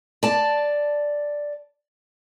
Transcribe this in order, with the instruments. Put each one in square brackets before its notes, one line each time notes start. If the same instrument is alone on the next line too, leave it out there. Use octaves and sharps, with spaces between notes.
[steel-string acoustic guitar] D5 A5